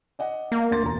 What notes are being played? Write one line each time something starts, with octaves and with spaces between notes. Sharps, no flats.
D5 D#5 F#5
A#3
D2 C6 A6
E1 A#5